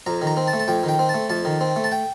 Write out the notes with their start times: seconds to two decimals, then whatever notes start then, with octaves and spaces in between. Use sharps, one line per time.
0.06 F2 A#5
0.22 D#3
0.27 A#5
0.37 C4
0.48 A5
0.53 A3
0.59 A5
0.68 F2 G5
0.83 D#3 G5
0.99 C4
1.09 A5
1.14 A3
1.30 F2 A5
1.45 D#3
1.61 C4
1.76 A3
1.84 A5
1.92 G5